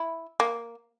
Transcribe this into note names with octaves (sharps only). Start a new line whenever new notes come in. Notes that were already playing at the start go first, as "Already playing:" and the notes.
Already playing: E4
A#3